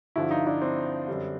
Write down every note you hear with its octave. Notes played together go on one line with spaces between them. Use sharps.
G2 D3 F3 E4 F#4
D#4 F4
D4 E4
C4 D4
F#2 D3 G3